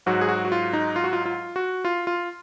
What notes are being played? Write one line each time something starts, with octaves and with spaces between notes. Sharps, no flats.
G#2 F#3 F#4
G#4
F#4
F#4
F4
D#4
F4
F#4
F4
F4
F#4
F4
F4